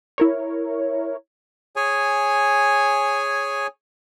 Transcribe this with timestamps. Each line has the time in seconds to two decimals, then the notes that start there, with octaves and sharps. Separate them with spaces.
0.18 E4 A#4 C#5
1.76 G#4 C#5 G#5